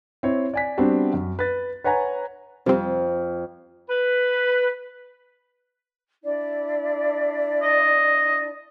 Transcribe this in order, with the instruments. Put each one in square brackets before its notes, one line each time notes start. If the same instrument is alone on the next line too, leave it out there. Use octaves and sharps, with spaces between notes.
[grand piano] C4 E4 C#5
D5 G#5 B6
G3 B3 C4 D4 F#4 G4
F#2
B4 A6
B4 C#5 F#5 G#5 A#5
[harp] F2 [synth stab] C3 G3 C4
[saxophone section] B4
[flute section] D4 E4 D5
[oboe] D#5